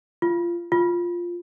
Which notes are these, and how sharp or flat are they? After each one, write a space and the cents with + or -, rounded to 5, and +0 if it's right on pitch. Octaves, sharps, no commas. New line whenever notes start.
F4 -20
F4 +0